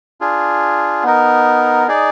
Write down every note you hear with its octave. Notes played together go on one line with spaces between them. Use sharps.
D4 F4 G#4
B3 D#4 A#4
D#4 G#4 D5